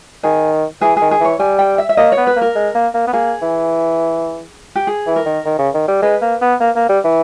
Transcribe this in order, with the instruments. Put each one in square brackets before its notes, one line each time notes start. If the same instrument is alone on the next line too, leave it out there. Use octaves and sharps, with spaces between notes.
[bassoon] D#3 [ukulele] G#4
[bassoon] E3 [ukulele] G#4
[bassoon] D#3 [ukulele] G#4
[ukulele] G#4
[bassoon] E3 [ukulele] C#5
[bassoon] G3 [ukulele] G#5
[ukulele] G5
E5
E5
[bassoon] A#3 [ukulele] D#5
[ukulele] C#5
[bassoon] B3
[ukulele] B4
[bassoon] A#3
[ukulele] A#4
[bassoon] G#3
A#3
A#3
B3
[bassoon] A#3 [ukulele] G#4
[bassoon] E3
[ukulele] G4
G#4
[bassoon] E3
[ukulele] A#4
[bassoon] D#3
D#3
C#3
D#3
G3
[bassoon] G#3 [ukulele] B4
[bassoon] A#3
B3
A#3
A#3
G3
E3